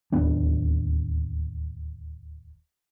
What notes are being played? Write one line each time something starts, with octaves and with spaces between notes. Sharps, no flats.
D1 D#2 B3 D4